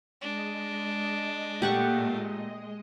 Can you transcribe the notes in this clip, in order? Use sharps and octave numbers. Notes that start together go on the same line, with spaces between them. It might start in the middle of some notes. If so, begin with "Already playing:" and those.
G#3 D4 D#5
A#2 A3 G4 F#5 C#6